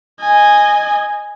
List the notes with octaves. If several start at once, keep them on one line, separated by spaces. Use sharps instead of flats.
D#5 G#5